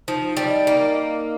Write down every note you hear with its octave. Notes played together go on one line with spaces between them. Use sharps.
F3 D#4
D#4
G3
D#5
A#3 D#4
D#5
D#5